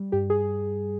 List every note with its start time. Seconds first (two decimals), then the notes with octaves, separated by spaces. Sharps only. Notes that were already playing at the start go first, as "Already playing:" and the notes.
Already playing: G3
0.12 G2 G4
0.30 G#4